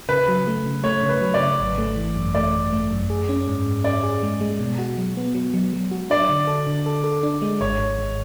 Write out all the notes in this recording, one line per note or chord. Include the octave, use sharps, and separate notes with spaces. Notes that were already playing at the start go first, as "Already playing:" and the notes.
C#3 B4
F#3
A3
C#3
A3 C#5
C#3
B4
F#3
D5
C#3
G#1
A3
E3
F#2
A3 D5
G#1
A3
F#2
G#4
C#4
G#2
G#2
C#4 D5
G#4
G#3
G#3
B2
F#4
F#3
B3
F#3
F#3
F#3
F#4
D4 D5
D3
A4
D3
A4
A4
D4
G#3
G#1 C#5
G#1
G#1